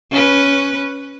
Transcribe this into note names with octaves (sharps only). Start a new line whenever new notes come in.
C#4 B4